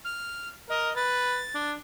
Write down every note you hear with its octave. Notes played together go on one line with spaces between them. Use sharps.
F6
A#4 D#5
B4 A6
D4